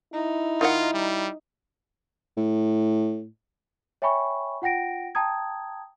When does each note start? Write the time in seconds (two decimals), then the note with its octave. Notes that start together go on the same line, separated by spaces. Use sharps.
0.13 D#4 E4
0.61 D#3 F4 F#4 F#5
0.94 G3
2.37 A2
4.02 C#5 E5 G5 G#5 B5 C#6
4.62 F4 F#5 G5 A#6 D7
5.15 G5 A5 A#5 D#6 G#6